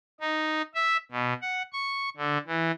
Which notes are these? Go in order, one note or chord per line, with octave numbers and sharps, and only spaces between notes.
D#4
E5
B2
F#5
C#6
D3
E3